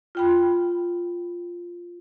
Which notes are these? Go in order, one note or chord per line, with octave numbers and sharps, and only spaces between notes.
F4 G5 B5